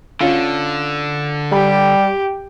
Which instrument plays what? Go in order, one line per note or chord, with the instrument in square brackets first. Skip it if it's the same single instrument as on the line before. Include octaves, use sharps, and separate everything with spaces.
[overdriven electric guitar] D3 [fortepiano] C#4 F4
[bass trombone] G3 [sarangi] G4 [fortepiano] B5